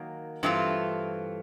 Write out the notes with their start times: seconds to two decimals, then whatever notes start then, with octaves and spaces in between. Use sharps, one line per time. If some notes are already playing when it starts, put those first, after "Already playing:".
Already playing: D#3 F#3 A#3
0.43 G2 E3 A3 C4 F4